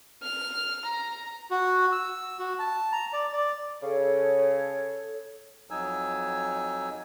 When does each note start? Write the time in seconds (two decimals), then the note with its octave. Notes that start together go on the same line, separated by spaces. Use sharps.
0.22 F6
0.85 A#5
1.51 F#4
1.92 E6
2.39 F#4
2.59 A5
2.92 A#5
3.13 D5
3.33 D5
3.82 C#3 A4 C#5
5.71 F2 F#3 D#4 G#5 E6